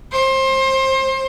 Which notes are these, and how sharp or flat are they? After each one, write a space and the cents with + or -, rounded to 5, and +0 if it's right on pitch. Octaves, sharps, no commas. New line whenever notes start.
C5 +25